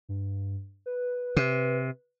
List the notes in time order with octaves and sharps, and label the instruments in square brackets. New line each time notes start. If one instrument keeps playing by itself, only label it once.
[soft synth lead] G2
B4
[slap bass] C3